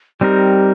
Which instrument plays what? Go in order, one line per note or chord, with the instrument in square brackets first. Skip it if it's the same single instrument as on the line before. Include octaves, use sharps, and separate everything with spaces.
[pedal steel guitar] G3 C4 D#4 A#4 [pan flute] G4